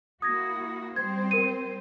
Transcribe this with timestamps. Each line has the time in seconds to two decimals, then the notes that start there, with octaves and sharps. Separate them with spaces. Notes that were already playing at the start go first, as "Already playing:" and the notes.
0.22 A#3 E4 F#4 D#6 G#6 A#6
0.96 G3 C4 C5 G#6
1.31 A#4 D#7